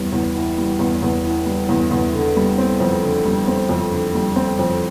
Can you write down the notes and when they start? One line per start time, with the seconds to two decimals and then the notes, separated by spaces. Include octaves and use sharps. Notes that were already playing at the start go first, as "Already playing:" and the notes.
Already playing: E2 G3
0.13 E2
0.36 E3
0.58 G3
0.79 E2
1.02 E2
1.25 E3
1.46 G3
1.69 E2
1.91 E2
2.13 D3
2.37 G3
2.58 C4
2.80 F2
3.03 D3
3.25 G3
3.48 C4
3.69 F2
3.91 D3
4.15 G3
4.36 C4
4.59 F2